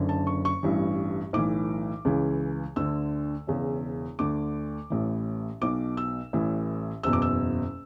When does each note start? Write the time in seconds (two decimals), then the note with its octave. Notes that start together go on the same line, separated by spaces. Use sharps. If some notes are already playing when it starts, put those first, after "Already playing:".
Already playing: F#1 F#2 D3
0.09 A5
0.27 C#6
0.45 C#6
0.63 A1 G2 E3
1.33 B1 A2 E3 D6
2.05 C#2 C#3 E3
2.76 D2 D3 E6
3.47 E1 E2 C#3
4.19 D2 D3 D6
4.90 A1 A2 E3
5.61 B1 B2 D6
5.97 E6
6.33 A1 A2 E3
7.03 F#1 E2 B2 E6
7.13 D6
7.22 E6